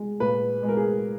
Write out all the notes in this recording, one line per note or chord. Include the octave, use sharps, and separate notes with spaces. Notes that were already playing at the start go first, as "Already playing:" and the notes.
Already playing: G#3
A#2 B4
G#3
A#4
G#4